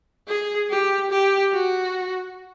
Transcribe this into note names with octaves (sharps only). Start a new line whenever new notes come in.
G#4
G4
G4
F#4